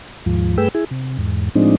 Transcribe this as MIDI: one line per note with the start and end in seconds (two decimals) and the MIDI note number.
0.26 0.57 39
0.26 0.57 44
0.26 0.57 53
0.58 0.68 43
0.58 0.68 57
0.58 0.68 68
0.58 0.68 71
0.58 0.68 79
0.58 0.68 88
0.75 0.85 64
0.75 0.85 68
0.91 1.17 48
1.19 1.49 40
1.19 1.49 44
1.55 1.76 45
1.55 1.76 53
1.55 1.76 56
1.55 1.76 60
1.55 1.76 62
1.55 1.76 63